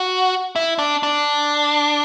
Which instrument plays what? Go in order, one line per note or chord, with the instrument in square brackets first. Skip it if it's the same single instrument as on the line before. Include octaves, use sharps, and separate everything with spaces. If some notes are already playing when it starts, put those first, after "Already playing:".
Already playing: [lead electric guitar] F#4
E4
D4
D4